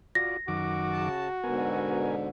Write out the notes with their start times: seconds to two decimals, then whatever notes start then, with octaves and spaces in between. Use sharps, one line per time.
0.15 F4 F#4 D5 A#6
0.48 F#2 D#3 F#4 D6
0.92 C#3 A5
1.44 G#2 B2 D3 B3 A#4 G#5